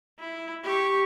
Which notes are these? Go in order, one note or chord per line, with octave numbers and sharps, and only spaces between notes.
E4
G4 C#6